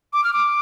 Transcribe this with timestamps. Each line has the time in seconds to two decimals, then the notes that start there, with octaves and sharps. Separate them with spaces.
0.13 D6
0.24 F6
0.33 D6